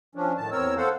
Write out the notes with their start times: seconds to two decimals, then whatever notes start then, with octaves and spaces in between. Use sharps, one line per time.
0.15 F3 C#4 D4
0.37 A2 D#3 A5
0.52 E2 C4 A#4 C#5 E6
0.77 A4 C5 F5 F#5